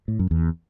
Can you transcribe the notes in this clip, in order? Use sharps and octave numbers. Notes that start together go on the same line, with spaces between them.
A2
F#2
E2